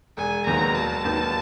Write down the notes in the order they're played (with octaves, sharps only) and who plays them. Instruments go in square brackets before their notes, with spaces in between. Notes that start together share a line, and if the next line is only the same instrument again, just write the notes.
[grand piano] E1 [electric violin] G#5
[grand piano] D#2 D#3 F#3 B3 [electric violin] A#5
[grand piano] E1 [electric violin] A5
[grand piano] D#2 D#3 F#3 B3